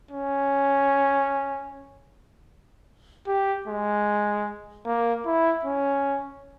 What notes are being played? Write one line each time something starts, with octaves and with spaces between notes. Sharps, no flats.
C#4
G4
G#3
A#3
E4
C#4